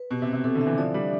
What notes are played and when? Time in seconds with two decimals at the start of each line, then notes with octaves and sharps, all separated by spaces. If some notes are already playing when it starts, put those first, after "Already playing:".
Already playing: B4
0.11 B2 G4
0.22 C3
0.27 C4
0.33 C3
0.44 C3 A4
0.55 D3
0.61 E5
0.67 E3
0.78 F3 D5
0.94 G3 D4